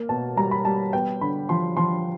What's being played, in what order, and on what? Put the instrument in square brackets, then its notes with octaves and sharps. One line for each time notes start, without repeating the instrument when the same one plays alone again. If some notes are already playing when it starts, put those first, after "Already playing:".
Already playing: [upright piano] A#3
B2 A5
G3 A#5
B5
G3 A5
B3 G5
D3 B5
F3 C6
F3 C6